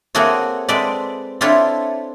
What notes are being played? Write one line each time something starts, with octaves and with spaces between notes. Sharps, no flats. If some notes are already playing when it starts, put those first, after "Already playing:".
A#3 C4 F#4 G#4 A4 C#5
G#3 C4 A4 B4 D5
C4 D4 E4 F4 A4 C#5